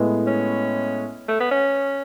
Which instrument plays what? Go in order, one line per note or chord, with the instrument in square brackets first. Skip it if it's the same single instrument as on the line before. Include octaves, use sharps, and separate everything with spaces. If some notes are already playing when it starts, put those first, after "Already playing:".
Already playing: [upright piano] A2 G#3 B3
[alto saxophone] C#4
A3
B3
C#4